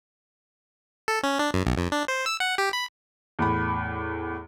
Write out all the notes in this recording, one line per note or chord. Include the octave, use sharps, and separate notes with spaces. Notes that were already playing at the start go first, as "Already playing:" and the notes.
A4
C#4
D4
F#2
B1
F2
D4
C5
E6
F#5
G4
B5
E2 A2 B5